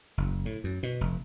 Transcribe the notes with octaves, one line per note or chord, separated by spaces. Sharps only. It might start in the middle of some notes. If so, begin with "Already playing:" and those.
F#1
A2
F#2
B2
F1